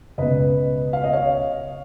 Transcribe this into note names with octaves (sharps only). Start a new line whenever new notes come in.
C#2 B2 B4 D#5
F5
D#5
C#5 F5